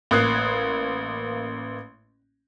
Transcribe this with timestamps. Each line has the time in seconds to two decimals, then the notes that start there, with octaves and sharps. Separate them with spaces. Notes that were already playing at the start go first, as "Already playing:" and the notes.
0.11 A1 A#3 D#6 F#6 G#6 C7